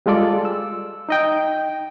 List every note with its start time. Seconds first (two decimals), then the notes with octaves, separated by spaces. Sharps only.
0.06 G3 G#3 F4 A4 D5
0.45 E6
1.09 D#4 D#5 G5